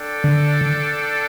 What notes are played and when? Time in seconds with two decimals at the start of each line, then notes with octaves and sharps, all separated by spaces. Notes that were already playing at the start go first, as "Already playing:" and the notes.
Already playing: D4 A4 D5 G5
0.24 D3